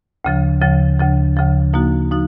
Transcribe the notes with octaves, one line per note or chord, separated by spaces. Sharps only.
D2 C#3 F3
D2 C#3 F3
D2 C#3 F3
D2 C#3 F3
F3 A#3 D#4 F#4
F3 A#3 D#4 F#4